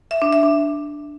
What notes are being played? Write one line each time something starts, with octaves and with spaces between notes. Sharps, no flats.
E5
D4
E5
D4